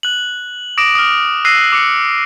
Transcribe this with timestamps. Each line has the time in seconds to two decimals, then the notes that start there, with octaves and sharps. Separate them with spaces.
0.03 F#6 F#7
0.78 D6 D#6 A#6 D7 E7
0.95 D#6 F6
1.45 E6 F#6 A#6 C7 D#7 G7
1.72 D6 C#7